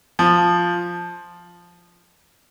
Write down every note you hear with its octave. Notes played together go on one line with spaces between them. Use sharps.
F3